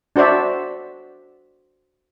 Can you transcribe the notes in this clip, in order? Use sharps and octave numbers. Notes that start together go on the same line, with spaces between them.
D4 F#4 C5 D5 E5